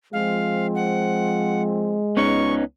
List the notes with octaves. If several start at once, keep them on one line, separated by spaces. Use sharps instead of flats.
F3 G#3 C4 F5
F#5
C#2 B3 C#4 D#4 C#6